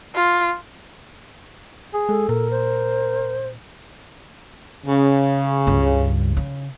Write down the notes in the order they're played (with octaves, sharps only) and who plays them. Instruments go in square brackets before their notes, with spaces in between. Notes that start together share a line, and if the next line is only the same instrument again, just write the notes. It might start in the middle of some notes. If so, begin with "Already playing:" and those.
[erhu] F4
[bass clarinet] G#4
[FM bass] G#3 [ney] A4
[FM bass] A#2 [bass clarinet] A#4
[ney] C5
[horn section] C#3
[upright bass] C#2 G2
C#3